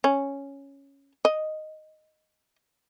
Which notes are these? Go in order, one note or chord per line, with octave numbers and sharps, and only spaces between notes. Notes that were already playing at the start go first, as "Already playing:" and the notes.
C#4
D#5